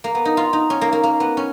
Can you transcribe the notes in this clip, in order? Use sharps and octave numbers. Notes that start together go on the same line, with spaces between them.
A#3
B3
D#4
F4
D#4
C#4
A#3
A#3
A#3
B3
C#4